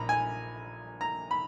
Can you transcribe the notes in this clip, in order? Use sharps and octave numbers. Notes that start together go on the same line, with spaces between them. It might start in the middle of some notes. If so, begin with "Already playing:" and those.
Already playing: A#1 A#5 B5
G#5
A#5
B5